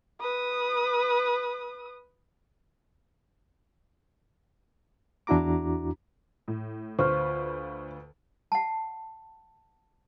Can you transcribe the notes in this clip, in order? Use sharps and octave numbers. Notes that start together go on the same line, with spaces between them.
B4 D#6
E2 D4 E4 F#4 A#5 D6
A2
D2 F4 B4 C5 C#6 F6
F#5 A5